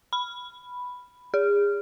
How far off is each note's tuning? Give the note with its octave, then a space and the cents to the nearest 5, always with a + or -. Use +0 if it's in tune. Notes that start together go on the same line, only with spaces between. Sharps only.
B5 +0
G#4 -35